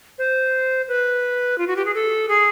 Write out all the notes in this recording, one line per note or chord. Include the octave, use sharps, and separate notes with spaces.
C5
B4
F4
F#4
G4
G#4
A4
G#4